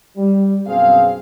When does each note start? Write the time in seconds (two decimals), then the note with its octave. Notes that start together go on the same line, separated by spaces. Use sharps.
0.17 G3
0.67 F#2 B2 C4 G#4 F5